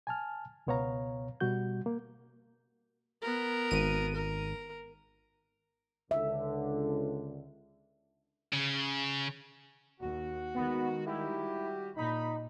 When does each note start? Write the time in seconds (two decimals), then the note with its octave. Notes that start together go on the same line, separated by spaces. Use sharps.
0.07 G#5 A5 F6
0.67 C#2 B2 B3 C#5 F5 A#5
1.40 B2 G3 F#4 G6
1.86 A#3
3.22 B3 A#4
3.71 G#1 D#7
4.15 A#4
6.11 C#2 D3 E5
8.53 C#3
10.00 D#2 F#4
10.54 D#3 G#3 B3
11.06 G3 E4 F#4 G4
11.96 A#2 D#4 B5